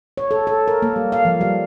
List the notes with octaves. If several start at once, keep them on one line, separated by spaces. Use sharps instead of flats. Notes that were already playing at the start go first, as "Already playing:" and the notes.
C#5
A4
A4
A#4
A#3
G3
F5
F3
G3